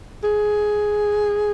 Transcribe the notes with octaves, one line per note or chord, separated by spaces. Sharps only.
G#4